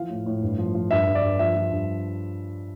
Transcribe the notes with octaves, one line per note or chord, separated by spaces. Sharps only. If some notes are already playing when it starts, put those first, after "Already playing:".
Already playing: E3 F3 F5
A2
A2
G2
F3
F3
G2 E5
G2
D5
G2
F3 E5
F3
G2